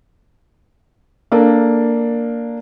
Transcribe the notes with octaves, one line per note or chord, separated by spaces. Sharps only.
A#3 D4 A4 A#4